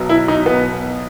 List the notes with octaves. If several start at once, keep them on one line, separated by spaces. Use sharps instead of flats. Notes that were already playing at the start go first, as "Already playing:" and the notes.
Already playing: B1 B2 F#3
E4
D#4
B3